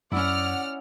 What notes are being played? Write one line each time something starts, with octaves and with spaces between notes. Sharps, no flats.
F#2 C#4 E4 D5 F#5 F6